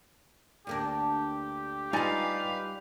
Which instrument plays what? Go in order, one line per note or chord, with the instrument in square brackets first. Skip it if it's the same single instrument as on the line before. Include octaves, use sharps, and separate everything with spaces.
[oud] D2 A#3 D4 [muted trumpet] G4
[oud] G3 F4 [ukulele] D#4 D5 G#5 [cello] B4 F5